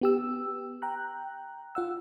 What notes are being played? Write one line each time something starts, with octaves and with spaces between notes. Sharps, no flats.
B3 G4 E6
G5 A#5 F#6
F4 F#5 E6